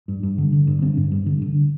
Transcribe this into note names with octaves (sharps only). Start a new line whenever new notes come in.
G2
G2
D3
D3
G2
D3 C4
G2
G2
D3
D3